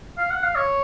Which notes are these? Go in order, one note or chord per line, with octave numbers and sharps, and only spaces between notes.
F5
F#5
F5
C#5